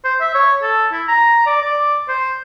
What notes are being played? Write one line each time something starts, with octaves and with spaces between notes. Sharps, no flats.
C5
E5
C#5
A4
E4
A#5
D5
D5
C5